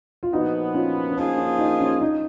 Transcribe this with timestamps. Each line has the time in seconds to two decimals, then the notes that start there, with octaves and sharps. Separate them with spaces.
0.23 F4
0.33 A#2 F3 B3 D#4 F#4
0.75 C#4 F4
1.09 C#4
1.17 F3 A#3 D#4 F4 G#4
1.38 C#4
1.59 D#4
1.81 C#4
2.01 D#4